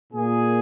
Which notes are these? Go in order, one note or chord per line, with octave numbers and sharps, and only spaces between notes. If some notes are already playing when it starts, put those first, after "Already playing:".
A#2 A#3 G#4